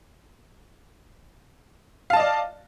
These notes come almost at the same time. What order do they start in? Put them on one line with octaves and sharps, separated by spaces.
F5 A5 D#5 D5